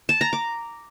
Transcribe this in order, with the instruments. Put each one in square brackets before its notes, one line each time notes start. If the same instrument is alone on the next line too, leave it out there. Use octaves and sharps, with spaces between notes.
[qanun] A5
A#5
D6